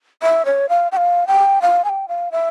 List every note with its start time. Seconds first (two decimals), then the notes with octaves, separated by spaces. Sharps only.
0.22 E5
0.45 C#5
0.69 F5
0.92 G5
0.97 F5
1.27 G5
1.62 F5
1.84 G#5
1.89 G5
2.08 F5
2.32 E5